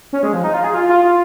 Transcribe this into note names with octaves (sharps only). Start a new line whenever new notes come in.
C#4
G#3
F3
D#4
F4
G#4
F4
F4
F4